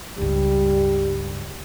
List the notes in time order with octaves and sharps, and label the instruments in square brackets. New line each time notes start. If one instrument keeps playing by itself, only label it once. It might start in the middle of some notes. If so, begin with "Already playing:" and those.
[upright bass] C#2 G2 [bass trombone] G3